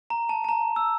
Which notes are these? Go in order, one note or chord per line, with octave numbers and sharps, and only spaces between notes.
A#5
A5
A5
A#5
E6